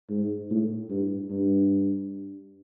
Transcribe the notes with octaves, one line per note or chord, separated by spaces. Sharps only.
G#2
A2
G2
G2